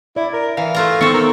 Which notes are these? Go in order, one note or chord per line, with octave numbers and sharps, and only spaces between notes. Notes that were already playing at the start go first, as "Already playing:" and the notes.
E4 D5
A#4
E3 F5
A3 F4 A#5
D#3 B3 C4 D#4 A4 C#6
A#4